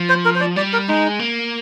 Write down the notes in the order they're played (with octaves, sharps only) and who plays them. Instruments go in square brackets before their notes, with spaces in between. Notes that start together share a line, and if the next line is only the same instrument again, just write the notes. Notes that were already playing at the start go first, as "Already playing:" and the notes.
Already playing: [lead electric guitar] F3
[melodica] C5
A#4
C5
D5
[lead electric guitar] G3 [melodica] D5
[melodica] A#4
[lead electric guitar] G#3 [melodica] D#4
[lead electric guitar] A#3